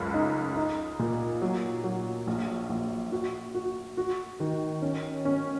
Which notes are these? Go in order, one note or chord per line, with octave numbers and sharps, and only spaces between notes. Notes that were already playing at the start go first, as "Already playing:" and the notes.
Already playing: C#2 F#2
D#4
D#4
A#2
F#3
F#3
A#1
A#1
F#4
F#4
F#4
D#3
C#4
C#4